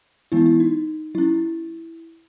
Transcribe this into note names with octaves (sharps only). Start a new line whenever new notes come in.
E3 G#3 B3 E4
E4
D#4
F#3 C#4 E4